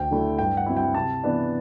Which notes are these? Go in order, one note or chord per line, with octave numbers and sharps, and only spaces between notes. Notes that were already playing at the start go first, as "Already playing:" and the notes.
Already playing: D2 G5
D3 F#3 A3 E4
G2 G5
F#5
F#3 C4 E4
G5
C3 A5
E3 B3 D4